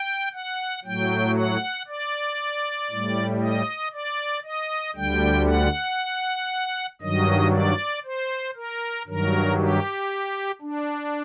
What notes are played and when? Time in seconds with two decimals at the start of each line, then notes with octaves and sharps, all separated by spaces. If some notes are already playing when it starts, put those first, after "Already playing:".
Already playing: G5
0.34 F#5
0.85 A2 F#3 G5
1.36 F#5
1.88 D5
2.91 A2 G3
3.42 D#5
3.94 D5
4.44 D#5
4.96 D2 D3 G3 G5
5.47 F#5
7.01 G2 D#3 F#3 D#5
7.53 D5
8.04 C5
8.56 A#4
9.07 G2 D#3 F#3 A#4
9.59 G4
10.62 D4